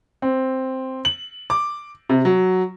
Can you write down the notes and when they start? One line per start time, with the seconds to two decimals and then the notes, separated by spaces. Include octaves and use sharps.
0.22 C4
1.05 F#7
1.50 D6
2.09 C3
2.25 F#3